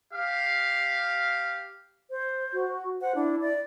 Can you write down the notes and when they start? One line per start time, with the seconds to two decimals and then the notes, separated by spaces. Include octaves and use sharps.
0.13 G4 F5
2.10 C5
2.53 F#4
3.01 C5 F#5
3.15 D4 E4
3.41 D5